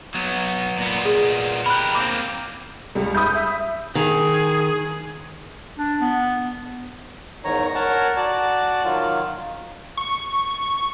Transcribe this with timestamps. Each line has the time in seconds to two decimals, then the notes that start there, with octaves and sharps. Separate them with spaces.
0.14 F#3 B3
0.78 A#2 B3
1.05 G#4
1.66 G4 A#4 B5 F#6
1.95 A#3 C4 D6
2.95 C#2 G3
3.15 B5 D#6 G6
3.35 E5
3.95 D#3 G#4
5.78 D4
6.01 B3
7.45 E2 G#2 D#3 C#5 A#5
7.75 A#4 C#5 F#5 A5
8.17 F#4 D5 A5
8.84 D#3 F#3 F4
9.97 C#6